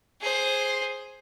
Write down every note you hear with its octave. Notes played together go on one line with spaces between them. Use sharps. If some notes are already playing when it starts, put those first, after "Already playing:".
G#4 C5